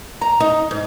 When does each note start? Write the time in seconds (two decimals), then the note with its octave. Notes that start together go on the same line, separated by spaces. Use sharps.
0.21 A#5
0.40 D#4
0.71 G#2